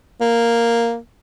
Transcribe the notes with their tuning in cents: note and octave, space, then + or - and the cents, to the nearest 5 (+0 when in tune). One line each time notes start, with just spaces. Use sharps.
A#3 +0